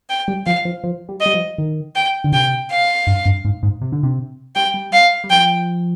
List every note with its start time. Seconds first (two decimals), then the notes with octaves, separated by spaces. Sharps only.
0.10 G5
0.28 G3
0.46 F3 F5
0.65 F3
0.84 F3
1.09 G3
1.20 D#5
1.26 G3
1.34 F3
1.58 D#3
1.95 G5
2.24 D3
2.32 C3 G5
2.71 F5
3.07 G2
3.25 G2
3.45 G#2
3.63 G#2
3.81 C3
3.92 D3
4.03 C3
4.55 G3 G5
4.74 G3
4.93 F5
5.24 G3
5.30 F3 G5